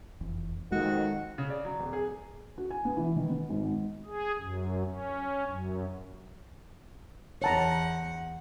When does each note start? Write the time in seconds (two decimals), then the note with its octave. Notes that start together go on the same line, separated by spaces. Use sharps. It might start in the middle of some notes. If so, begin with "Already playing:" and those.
0.21 F1 E2
0.72 F2 D#3 G#3 A#3 F#4
1.38 C#3
1.50 D5
1.65 F#3
1.80 D1
1.93 G#4
2.58 F#4
2.70 G#5
2.85 B3
2.97 E3
3.16 D#3
3.29 B3
3.50 G#1
4.06 G#4
4.38 F#2
4.84 C#4
5.45 F#2
7.42 E2 C#5 F#5 A5 A#5